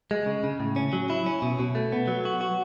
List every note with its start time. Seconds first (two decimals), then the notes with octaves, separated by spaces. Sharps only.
0.11 G#3
0.26 C#3
0.44 C#3
0.60 A2
0.76 C#4
0.93 F#3
1.10 E4
1.26 C#4
1.42 B2
1.59 B2
1.75 A3
1.92 B3
2.08 F#3
2.25 F#4
2.41 F#4